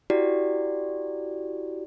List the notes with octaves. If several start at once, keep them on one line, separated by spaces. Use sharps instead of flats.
E4 F#4 G4 D5